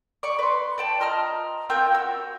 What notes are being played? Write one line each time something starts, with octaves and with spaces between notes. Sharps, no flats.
D5 C#6
B4 C6
D5 G5 A5
F4 D#5 A#5 F6
C4 F4 A#4 G5
F#4 E6